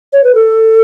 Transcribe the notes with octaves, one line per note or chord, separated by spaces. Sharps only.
C#5
B4
A4